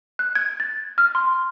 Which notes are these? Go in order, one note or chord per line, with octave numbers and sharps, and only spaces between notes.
F#6
G#6
A6
F6
C6